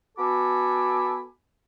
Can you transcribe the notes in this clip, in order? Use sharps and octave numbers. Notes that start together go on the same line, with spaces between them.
B3 F#4 A4 G#5 B5 D6